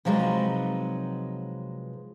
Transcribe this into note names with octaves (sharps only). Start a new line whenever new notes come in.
C3 F3 F#3 G#3 D#4 B4